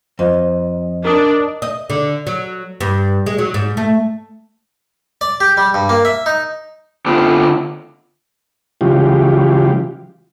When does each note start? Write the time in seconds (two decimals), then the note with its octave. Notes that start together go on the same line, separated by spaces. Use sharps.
0.19 F2 D#5
1.05 D4 A#4 D#6
1.62 D#5
1.90 D3
2.27 F#3
2.81 G2
3.26 G#3
3.38 F#3
3.54 G#2
3.77 A3
5.21 D5
5.40 G4
5.57 G3
5.74 G2
5.89 A#3
6.05 E5
6.26 D#4
7.06 D3 A3 B3 C4 F4 G#4
8.81 C#3 E3 F#3 G#3 F4 G4